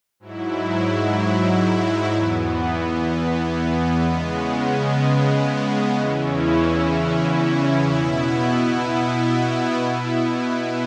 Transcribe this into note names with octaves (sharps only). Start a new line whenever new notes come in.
G#2 F#3 E4
E2 E3 B3
C#3 G#3 B3
E2 C#3 E3 C#4 E4
B2 B3 E4
B2 B3 E4